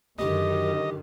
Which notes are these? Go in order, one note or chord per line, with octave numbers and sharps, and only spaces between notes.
F#2 D3 D#3 G4 D#5